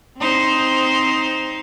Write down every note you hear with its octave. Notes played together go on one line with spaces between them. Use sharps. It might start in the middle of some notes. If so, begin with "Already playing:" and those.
C4 D#4 C5